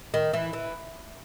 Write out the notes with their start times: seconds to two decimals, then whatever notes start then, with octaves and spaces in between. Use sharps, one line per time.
0.14 D#3
0.33 E3
0.53 E3